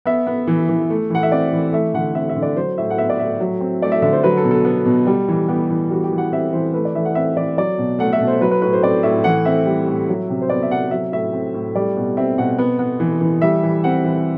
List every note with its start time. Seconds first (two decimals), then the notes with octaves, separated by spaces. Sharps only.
0.05 B3 E5
0.27 B3
0.47 E3
0.69 E3
0.90 A3
1.10 E3 F#5
1.23 E5
1.32 C4 D5
1.53 E3
1.72 A3 E5
1.94 D3 F#5
2.15 C4 E5
2.29 E5
2.36 D3
2.42 D5
2.56 F#3 C5
2.78 A2 E5
2.90 F#5
2.98 B3 E5
3.09 D5
3.19 A2 E5
3.40 F#3
3.60 C4
3.82 A3 D5
3.92 E5
4.02 D3 E5
4.13 C5
4.23 F#3 B4
4.37 A4
4.44 B2
4.51 A4
4.65 B3
4.86 B2
5.07 G3
5.28 E3
5.48 B3 G4
5.70 E3
5.90 G3 F#4
6.04 G4
6.12 E3
6.18 F#5
6.32 C4 E5
6.53 E3 C5
6.74 A3 B4
6.85 D5
6.95 E3 E5
7.05 F#5
7.15 C4 E5
7.37 E3 D5
7.57 F#3 D5
7.78 B2
7.99 A3 F#5
8.13 E5
8.21 B2
8.27 C5
8.41 F#3 B4
8.51 B4
8.62 A2 B4
8.73 C5
8.83 C4 D5
9.03 A2 E5
9.24 E3 F#5
9.45 C4 E5
9.66 G3
9.87 A2
10.09 F#3
10.30 C3
10.42 C5
10.50 B3 D5
10.63 E5
10.71 C3 F#5
10.91 F#3 E5
11.12 A2 E5
11.33 C4
11.54 A2
11.75 G3 D5
11.97 B2
12.17 C4 E5
12.38 B2 F#5
12.58 B3
12.79 B3
13.00 E3
13.21 E3
13.42 G3 E5
13.63 E3
13.84 C4 F#5
14.04 E3